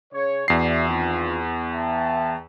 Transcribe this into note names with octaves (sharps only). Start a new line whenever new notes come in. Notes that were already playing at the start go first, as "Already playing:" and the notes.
C#3 C#5
E2 F#4 D5 E5 C7
D#3 C4 F4
E5 G5 A5